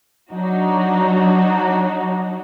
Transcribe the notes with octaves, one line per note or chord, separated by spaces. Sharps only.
F#3 D4 D#4 F#4